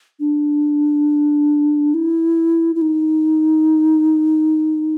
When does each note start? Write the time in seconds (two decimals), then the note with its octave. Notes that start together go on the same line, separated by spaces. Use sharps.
0.20 D4
1.94 E4
2.76 E4
2.82 D#4